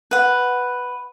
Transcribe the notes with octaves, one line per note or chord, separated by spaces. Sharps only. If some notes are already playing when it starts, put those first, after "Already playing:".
B4 F#5